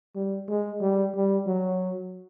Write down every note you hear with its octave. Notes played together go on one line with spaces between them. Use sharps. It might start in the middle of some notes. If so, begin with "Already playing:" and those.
G3
G#3
G3
G3
F#3